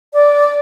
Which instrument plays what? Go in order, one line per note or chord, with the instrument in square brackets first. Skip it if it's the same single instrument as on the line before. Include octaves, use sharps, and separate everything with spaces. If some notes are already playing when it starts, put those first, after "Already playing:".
[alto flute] D5